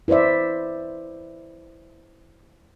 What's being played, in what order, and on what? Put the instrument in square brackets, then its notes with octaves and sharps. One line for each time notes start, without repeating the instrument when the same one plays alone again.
[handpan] E4 B4 C5 D5 E5